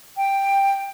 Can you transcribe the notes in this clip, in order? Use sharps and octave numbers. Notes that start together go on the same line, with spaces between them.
G5